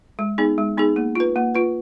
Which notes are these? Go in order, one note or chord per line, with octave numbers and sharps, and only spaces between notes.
G#3
B3 D#4 G#4
G#3
B3 D#4 G#4
A#3
F4 B4
A#3
F4 B4